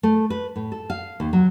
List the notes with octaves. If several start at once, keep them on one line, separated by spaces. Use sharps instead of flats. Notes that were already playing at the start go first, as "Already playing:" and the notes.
A3
B4
A2
A4
F5
D#2
F#3